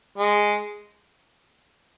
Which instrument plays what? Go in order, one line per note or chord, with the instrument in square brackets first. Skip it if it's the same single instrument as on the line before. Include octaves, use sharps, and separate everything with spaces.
[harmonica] G#3